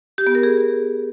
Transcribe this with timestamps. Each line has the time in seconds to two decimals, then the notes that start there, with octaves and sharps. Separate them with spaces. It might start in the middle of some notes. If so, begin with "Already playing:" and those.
0.18 G4
0.27 B3
0.35 A#4
0.43 G#4